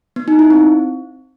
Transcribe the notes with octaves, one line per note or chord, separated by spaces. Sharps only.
B3
D#4
E4
C4